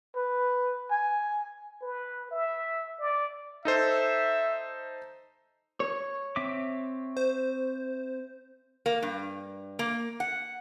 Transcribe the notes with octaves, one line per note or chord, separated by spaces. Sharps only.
B4
G#5
B4
E5
D5
D#4 A4 C5 E5
C#5
C4 E5 D6
C5
A#3
G2
A#3
F#5